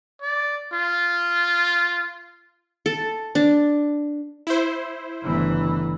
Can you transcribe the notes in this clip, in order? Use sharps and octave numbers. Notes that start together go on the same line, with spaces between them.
D5
F4
A4
D4
E4 C5
G1 C#3 E3 A3 B3